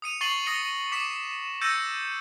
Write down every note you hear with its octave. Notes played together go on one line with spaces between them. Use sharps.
D#6 C#7 D#7 F7
C#6 A6 C7 D#7 F#7 G7
D#6 A#6 C#7 G7
D6 B6 C#7 E7
E6 G6 A6 A#6 C#7 D#7